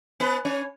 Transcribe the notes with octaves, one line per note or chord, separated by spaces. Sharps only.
B3 B4
C#4 C#5